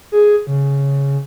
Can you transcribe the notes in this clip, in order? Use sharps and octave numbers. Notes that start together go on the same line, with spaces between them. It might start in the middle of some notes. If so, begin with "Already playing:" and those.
G#4
C#3